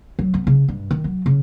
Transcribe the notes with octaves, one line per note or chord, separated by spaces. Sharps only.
F#3
B3
C#3
G2
D#3
F#3
C#3